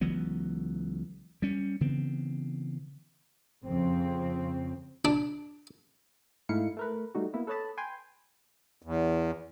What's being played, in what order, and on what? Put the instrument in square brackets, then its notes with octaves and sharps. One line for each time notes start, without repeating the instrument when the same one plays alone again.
[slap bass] C#2 E3 F#3 B3
G3 C#4
C#3 E3 B3 C4
[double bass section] F2 C#3 C4
[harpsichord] D4
[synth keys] G#2 A3 D#4 E4 F5 C#7
A3 A#4 B4
G3 A3 D#4 F#4
A#3 B3 E4
A4 B4 C#5 D#5 A5 B5
B4 G5 G#5 C6
[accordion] E2